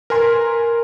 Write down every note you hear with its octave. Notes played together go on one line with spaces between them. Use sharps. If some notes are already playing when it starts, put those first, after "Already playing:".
A#4 B4 G#5 C6